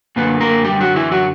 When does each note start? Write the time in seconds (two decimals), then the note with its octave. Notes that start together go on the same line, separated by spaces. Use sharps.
0.16 F#2 D3 A#3 B4
0.40 A#3 A#4
0.64 G3 G4
0.80 F#3 F#4
0.96 E3 E4
1.11 F#3 F#4